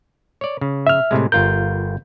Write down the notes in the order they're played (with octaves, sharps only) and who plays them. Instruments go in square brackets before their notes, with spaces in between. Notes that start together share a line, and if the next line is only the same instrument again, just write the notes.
[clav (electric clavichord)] C#5 D5
C#3
[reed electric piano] E5 F6
[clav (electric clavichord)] A2 C3 G#3
[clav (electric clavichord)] G1 F4 A#4 [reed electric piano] G6